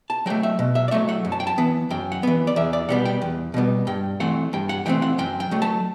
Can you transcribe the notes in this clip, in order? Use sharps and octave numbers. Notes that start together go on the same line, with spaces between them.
A5
F#3 A3 G5
E5
B2
E5
D5
F#3 A3 E5
F#5
F#2
A5
G5
A5
E3 B3
F#2 G5
F#5
E3 B3
D5
E2 E5
D5
B2 G3 B3 F#5
G5
E2
B2 G3 B3
G2 G5
E3 A3 C4 F#5
G2 G5
F#5
E3 A3 C4 G5
F#5
F#2 G5
G5
F#3 A3
A5